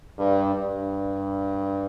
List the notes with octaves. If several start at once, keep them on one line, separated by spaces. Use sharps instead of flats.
G2
G2